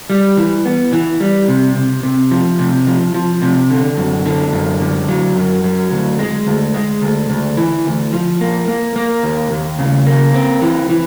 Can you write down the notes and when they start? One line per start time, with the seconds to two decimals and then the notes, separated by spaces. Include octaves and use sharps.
0.10 G3
0.37 E3
0.65 B3
0.93 E3
1.20 G3
1.48 C3
1.76 C3
2.03 C3
2.31 F3
2.59 C3
2.87 F3
3.14 F3
3.42 C3
3.70 D3
3.97 F#2
4.25 D3
4.53 F#2
4.80 D3
5.08 F#3
5.36 F#2
5.64 F#3
5.91 D2
6.19 G#3
6.47 D2
6.74 G#3
7.02 D2
7.30 D2
7.57 E3
7.85 D2
8.13 F3
8.41 A#3
8.68 A#3
8.96 A#3
9.23 D#2
9.51 D#2
9.79 C#3
10.06 A#3
10.34 C4
10.62 E3
10.90 E3